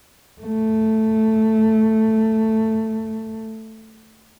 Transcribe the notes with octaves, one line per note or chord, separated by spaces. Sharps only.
A3